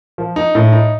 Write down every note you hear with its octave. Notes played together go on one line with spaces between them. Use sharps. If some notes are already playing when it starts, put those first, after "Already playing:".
F3
D#4
A2
D#4